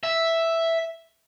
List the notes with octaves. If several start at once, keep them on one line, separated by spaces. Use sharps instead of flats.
E5